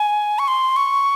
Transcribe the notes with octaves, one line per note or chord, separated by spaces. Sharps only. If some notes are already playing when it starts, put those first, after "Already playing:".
Already playing: G#5
C#6
C6
C#6